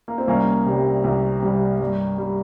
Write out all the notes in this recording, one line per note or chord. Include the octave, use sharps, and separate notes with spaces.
A#3
C4
C2 A#3 C#4
C3 G3
C2
C3 G3
G2
G3